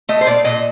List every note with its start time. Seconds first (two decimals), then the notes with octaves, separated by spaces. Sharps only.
0.09 A3 D#5
0.21 C5
0.26 A#2 D5
0.44 A#2 D#5